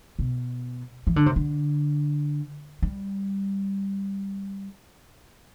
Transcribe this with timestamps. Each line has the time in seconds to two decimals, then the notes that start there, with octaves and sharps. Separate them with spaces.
0.19 B2
1.07 E3
1.16 D3
1.26 C3
1.36 D3
2.82 G3